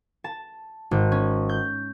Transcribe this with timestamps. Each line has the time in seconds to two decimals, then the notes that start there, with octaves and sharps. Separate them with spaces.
0.24 A5
0.91 G#1
1.12 C#4
1.49 G6